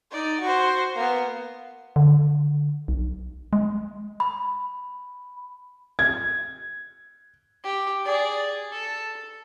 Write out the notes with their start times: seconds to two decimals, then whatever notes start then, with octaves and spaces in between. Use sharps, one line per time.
0.12 D#4 D5
0.40 F#4 C5
0.96 A#3 B3
1.96 D3
2.88 B1
3.53 G#3
4.20 B5
5.99 G#6
7.64 G4
8.05 G#4 D5
8.72 A4